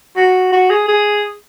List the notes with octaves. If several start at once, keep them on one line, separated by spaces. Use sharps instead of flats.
F#4
F#4
G#4
G#4